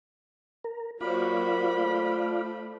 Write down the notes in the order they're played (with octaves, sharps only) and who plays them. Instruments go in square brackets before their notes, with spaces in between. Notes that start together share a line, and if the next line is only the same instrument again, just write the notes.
[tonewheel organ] A#4
[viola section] F#3 A#3 F#4 [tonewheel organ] F4 D5 F5 [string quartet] C5 B5
[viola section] A3